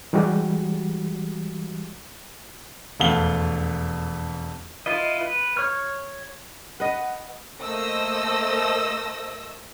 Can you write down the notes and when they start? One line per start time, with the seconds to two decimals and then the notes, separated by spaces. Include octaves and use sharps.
0.13 E3 G3 G#3 F#4 G4
3.00 E1 F2 A3 F5 F#5 G7
4.86 E4 F4 B4 D#5
5.21 B4
5.57 C#5 C#6 F6
6.80 B4 D#5 F#5
7.61 A3 A#3 C5 D#5 E6 A#6